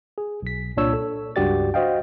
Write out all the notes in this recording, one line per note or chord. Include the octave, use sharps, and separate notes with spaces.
G#4
B1 B6
C2 A#2 D4 C#5 E6
A4
C#2 G2 F#4 G4 D5 A6
F#4 C5 D#5 F5 G5